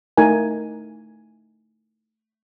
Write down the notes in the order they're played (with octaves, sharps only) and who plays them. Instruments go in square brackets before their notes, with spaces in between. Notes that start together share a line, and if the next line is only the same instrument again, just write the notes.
[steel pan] A3 D#4 A#4 G#5